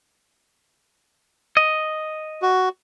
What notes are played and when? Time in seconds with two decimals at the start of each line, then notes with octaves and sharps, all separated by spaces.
1.57 D#5
2.42 F#4